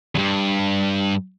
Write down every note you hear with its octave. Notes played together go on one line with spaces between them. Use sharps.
E2 G2